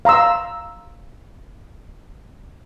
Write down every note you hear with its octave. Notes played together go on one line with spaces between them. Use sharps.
F5 A#5 C6 E6